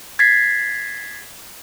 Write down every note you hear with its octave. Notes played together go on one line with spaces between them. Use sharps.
G#6 A6 B6 C7